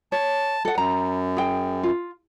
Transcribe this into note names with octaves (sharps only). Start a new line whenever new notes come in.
C#5 A5
A4 F#5
F#2 A#5
G#4 G5
F4